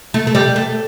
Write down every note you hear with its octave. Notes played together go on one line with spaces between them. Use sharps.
A3
A3
G3
A3